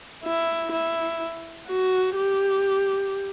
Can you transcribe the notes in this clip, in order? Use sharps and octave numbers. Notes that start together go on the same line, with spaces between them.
E4
E4
F#4
G4